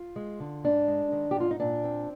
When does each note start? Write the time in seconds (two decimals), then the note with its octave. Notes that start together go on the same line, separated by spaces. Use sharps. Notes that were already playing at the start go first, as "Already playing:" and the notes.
Already playing: F4
0.16 G#3
0.40 D3
0.64 G#2 D4
0.88 G#3
1.12 D#3
1.31 G4
1.36 G#2 F4
1.51 D#4
1.60 A#2 D4
1.84 C4